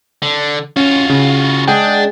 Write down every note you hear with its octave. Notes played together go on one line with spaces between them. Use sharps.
D3
C#4 F4 F#4
C#3
G#3 D4 G#4 F#5 G5